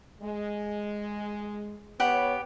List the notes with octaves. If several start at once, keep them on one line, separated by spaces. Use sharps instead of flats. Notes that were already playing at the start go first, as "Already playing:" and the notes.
G#3
B3 G4 C#5 F#5 B5